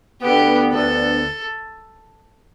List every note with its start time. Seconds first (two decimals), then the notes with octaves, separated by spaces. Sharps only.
0.22 D2 D3 B3 G4
0.72 D2 D3 B3 A4